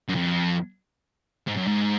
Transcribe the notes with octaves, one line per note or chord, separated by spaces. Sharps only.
F#2
F2
G#2
F#2
G#2